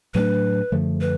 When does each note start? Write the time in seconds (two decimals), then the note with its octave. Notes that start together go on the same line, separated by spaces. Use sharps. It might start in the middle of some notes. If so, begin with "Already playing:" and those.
0.14 A2 F#3 A3 D4 B4
0.72 F#2 D3 F3 A3
1.01 B4